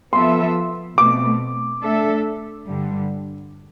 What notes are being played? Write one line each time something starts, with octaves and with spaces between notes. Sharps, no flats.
F3 B3 F4 A4 E5 C6
B2 A3 C4 D6
A3 D4 A4 E5
G2 D3 G3